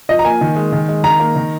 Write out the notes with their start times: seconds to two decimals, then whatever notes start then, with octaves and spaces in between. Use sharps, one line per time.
0.09 F3 D#5
0.19 A#5
0.25 A#3 G#5
0.41 D#3
0.56 G#3
0.72 D#3
0.89 G#3
1.03 D#3 A#5
1.20 A#3
1.36 D#3